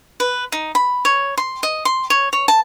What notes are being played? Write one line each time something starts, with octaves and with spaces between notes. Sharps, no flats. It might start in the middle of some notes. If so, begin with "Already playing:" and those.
B4
D#4
B5
C#5
C6
D#5
C6
C#5
C#5
A5